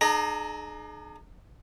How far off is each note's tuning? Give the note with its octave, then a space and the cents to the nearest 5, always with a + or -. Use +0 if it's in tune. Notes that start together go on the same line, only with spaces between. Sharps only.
D#4 -45 G#4 +35 A#5 +0